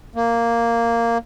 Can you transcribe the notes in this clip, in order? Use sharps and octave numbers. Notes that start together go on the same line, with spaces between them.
A#3